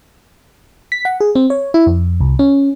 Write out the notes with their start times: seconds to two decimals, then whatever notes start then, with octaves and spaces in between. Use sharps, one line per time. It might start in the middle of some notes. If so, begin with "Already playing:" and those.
0.92 B6
1.05 F#5
1.20 G#4
1.35 C4
1.50 C#5
1.74 E4
1.87 F2
2.21 C2
2.39 C#4